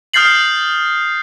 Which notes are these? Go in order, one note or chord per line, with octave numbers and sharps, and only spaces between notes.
D#6 F6 G6 A6 C7 F#7